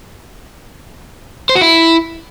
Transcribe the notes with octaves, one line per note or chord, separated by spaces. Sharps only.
C5
F#4
E4